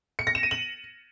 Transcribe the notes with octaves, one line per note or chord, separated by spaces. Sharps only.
C#7
A#6
E7
D#7
F#7